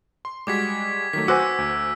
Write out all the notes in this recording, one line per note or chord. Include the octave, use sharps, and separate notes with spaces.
C6
G3 G#3 F#4 D6 G#6 B6
D#3 F#3 A3 B6
F#4 C5 G#5 D6 E6 F#6 A#6
D2